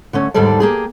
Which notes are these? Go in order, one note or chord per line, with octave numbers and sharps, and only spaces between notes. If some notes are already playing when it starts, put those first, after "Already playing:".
D3 A3 C#4
D#2 G#2 D3 G3 A4 D5
A#3 G4 G#4